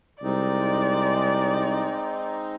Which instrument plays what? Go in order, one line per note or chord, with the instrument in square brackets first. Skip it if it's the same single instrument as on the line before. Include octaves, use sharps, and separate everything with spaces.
[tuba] C2 [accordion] G#3 C4 D#4 [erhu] D5